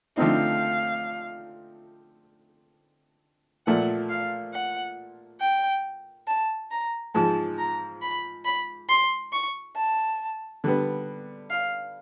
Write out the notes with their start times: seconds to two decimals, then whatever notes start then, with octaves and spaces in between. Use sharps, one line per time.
0.17 D3 F3 A3 C4 D#4 F5
3.66 A#2 F3 A3 F#5
4.10 F5
4.53 F#5
5.41 G5
6.27 A5
6.71 A#5
7.15 G#2 F3 G#3 A5
7.58 A#5
8.02 B5
8.45 B5
8.89 C6
9.32 C#6
9.76 A5
10.64 D3 G3 B3
11.50 F5